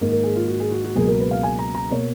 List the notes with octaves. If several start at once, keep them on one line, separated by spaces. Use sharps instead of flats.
G#2 D#3 A#3
A#4
G#4
F4
F#4
G#4
F#4
F#4
C#2 B2 F#3 A#3 G#4
A#4
B4
F5
G#5
A#5
A#5
B2 A#3 C#5